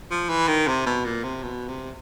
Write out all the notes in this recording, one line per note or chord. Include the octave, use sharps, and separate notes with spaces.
F3
E3
D#3
C3
B2
A#2
C3
B2
C3